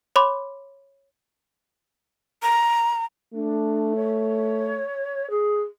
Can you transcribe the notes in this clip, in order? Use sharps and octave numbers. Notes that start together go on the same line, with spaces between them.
C#5 B5 C6 D6
A#5
A3 D4
C#5
G#4